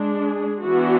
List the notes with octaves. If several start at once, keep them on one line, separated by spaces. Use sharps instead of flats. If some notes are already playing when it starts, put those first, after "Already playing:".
Already playing: G#3 D4
G#4
E3 B3 D4 F#4